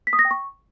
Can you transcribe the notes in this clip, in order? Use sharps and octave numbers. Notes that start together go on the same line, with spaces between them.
B6
D#6
A#6
G5
C#6